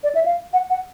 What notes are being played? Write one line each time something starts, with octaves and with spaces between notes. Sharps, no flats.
D5
E5
F5
F#5
F#5